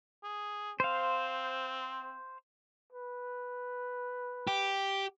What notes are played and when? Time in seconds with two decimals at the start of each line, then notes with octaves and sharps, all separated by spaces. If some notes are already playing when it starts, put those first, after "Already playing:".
0.24 G#4
0.80 C4 C5 F5
2.92 B4
4.47 G4